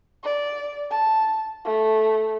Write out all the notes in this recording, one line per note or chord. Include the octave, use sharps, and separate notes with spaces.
D5
A5
A3